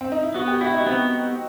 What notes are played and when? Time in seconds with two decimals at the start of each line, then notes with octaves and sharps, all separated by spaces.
0.01 C4
0.12 D#4
0.23 E4
0.34 B3 F#4
0.48 G4
0.61 E4 F#4
0.74 D#4
0.87 B3 C4